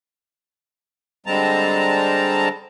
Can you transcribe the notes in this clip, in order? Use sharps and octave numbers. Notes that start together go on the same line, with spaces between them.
D3 G3 G#3 C4 A5 A#5